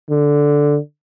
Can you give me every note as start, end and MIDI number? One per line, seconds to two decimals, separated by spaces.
0.10 0.78 50